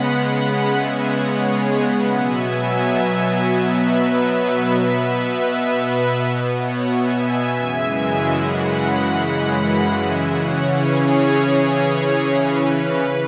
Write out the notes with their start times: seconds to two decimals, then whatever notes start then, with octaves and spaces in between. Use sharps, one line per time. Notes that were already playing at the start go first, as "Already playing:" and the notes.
Already playing: C#3 G#3 B3 F#5 B5
0.72 E5 G#5
1.06 C#5 F#5
1.41 G#4 C#5
1.75 F#5 B5
2.09 B2 F#3 B3 E5 G#5
3.46 B4 E5
4.82 B2 B3 B4 E5
6.54 C#5 F#5
6.88 E5 G#5
7.56 F#2 C#3 E3 G#3
8.24 F#5 B5
9.61 F#5 B5
9.95 E5 G#5
10.29 C#3 E3 C#4 C#5 F#5
10.64 G#4 C#5
12.34 B4